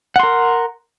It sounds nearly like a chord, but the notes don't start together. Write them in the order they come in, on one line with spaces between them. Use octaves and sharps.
F#5 C6 A#4